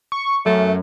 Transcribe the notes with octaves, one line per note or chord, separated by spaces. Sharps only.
C#6
F#2 A3